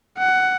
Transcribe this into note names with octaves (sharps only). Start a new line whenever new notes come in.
F#5